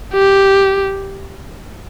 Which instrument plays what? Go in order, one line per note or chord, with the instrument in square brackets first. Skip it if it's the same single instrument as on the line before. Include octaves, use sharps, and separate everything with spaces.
[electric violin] G4